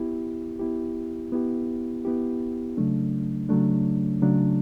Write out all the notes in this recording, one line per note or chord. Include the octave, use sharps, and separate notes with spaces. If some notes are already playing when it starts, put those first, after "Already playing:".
Already playing: B3 E4 G4
B3 E4 G4
B3 E4 G4
B3 E4 G4
C#3 F#3 A3 D4
C#3 F#3 A3 D4
C#3 F#3 A3 D4